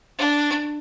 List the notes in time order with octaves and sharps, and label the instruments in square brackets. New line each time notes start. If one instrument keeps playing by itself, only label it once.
[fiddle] D4